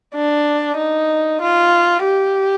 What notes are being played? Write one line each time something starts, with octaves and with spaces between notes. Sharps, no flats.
D4
D#4
F4
G4